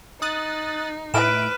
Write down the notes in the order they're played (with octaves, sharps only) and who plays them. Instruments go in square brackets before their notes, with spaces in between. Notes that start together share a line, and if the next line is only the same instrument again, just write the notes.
[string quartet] D#4 [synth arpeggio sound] D#6 F#6 A6
[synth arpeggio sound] A2 E4 D7 [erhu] B4 [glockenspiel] F6 E7